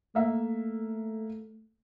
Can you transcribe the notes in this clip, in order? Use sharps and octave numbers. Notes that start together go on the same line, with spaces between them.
A3 A#3 E5